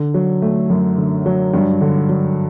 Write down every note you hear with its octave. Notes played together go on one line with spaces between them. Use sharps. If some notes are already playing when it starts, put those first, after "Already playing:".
Already playing: D3
F#3
A3
F#2
D3
F#3
G2
D3
F#3